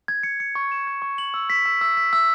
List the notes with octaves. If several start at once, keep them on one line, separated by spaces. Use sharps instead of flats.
G#6
C#7
C#7
C#6
E7
G#6
C#6
F#7
E6
B6
E6
E6
B6
E6